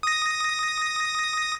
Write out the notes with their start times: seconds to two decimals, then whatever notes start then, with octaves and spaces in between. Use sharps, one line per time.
0.03 D#6 A#6